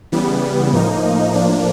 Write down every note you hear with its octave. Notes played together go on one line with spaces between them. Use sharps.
C#3 E3 G3 B3
A2 F3 A#3 D#4
A2 F3 A#3 D4